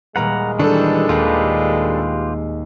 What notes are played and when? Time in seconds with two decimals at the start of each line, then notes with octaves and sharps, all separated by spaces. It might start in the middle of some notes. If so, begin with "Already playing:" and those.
0.16 D#1 G#3 A#3 B4 F#5 A#5
0.59 D#3 E3 G3 D4 A4
1.09 D#2 F4 G4 B4